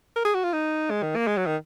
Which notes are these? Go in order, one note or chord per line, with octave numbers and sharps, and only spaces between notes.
A#4
G#4
F#4
F4
D#4
G#3
D#3
A#3
G#3
F#3
D#3